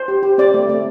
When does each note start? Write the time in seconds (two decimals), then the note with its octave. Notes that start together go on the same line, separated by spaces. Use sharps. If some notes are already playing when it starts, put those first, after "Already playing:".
Already playing: C5
0.08 G4
0.23 G4
0.38 C4 D5
0.54 A3
0.69 A3